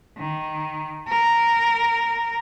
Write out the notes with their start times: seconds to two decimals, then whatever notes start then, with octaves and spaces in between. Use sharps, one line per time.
0.17 D#3
1.08 A#4